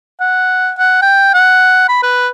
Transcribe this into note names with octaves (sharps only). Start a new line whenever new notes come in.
F#5
F#5
G5
F#5
B5
B4